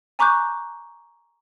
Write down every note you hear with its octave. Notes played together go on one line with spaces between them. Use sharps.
G#5 A#5 C#6 D6 F#6 G6